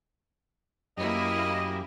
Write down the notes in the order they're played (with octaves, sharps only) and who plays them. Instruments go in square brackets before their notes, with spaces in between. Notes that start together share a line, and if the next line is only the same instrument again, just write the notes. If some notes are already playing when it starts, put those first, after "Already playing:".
[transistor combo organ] F#2 G4 [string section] A#3 E4 [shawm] D#5